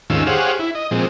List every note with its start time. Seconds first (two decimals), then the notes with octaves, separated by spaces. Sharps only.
0.10 D#2 G#2 D#3 C#4 F4 E6
0.27 G4 G#4 C5 C#5 F5 F#5
0.59 E4
0.75 D#5
0.91 A#2 F3 G#3 C4